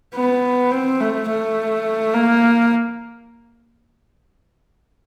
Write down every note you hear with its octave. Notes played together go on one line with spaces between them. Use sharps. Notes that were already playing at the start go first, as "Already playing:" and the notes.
B3
C4
A3
A3
A#3